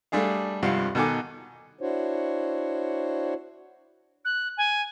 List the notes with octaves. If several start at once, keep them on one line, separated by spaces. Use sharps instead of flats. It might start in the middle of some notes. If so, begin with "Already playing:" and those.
G3 A3 D4 G#4 F5
G#1 G2 C3 F3 F5 F#5
B2 D#3 A4 F#5 G#5 D6
D4 E4 F#4 C5 C#5
F#6
G#5